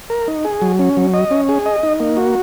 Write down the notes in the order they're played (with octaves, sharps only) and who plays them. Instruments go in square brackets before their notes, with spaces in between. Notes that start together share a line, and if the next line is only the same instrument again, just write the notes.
[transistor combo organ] A#4
D#4
G#4
F#3
C#4
F#3
D#5
C#4
G#4
D#5
D#4
A#3
F#4